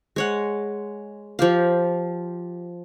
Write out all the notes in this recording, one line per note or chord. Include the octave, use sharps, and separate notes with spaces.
G#3 C#5 F#5
F3 G4 F5